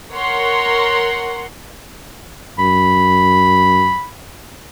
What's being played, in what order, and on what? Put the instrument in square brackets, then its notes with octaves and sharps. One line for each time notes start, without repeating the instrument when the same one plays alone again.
[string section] A#4 C#5 F#5 C6
[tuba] F#2 [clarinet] B5